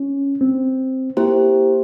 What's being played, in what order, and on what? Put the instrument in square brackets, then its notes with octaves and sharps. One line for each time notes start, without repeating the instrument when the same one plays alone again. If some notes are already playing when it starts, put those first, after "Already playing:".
Already playing: [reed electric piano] C#4
C4
[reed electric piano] A#3 [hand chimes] E4 G4 C5